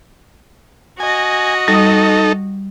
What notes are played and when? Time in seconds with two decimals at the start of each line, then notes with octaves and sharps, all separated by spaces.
1.00 F#4 D#5 G#5
1.68 G3 D#4 A4 D#6